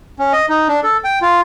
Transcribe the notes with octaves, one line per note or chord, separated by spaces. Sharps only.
C#4
D#5
D#4
D4
A4
G5
F4